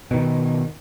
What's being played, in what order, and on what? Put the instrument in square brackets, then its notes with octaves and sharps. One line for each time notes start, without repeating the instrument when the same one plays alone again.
[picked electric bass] B2 D#3